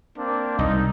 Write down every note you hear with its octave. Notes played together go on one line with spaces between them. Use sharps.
A#3 C4 D4
C2 D#4